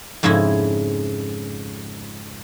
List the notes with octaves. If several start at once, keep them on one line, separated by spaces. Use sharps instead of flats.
F2 G#2 C#3 C#4 E4